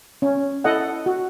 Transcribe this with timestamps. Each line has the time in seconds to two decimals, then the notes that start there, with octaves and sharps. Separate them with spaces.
0.22 C#4
0.64 E4 A4 D#5 F#5
1.06 F#4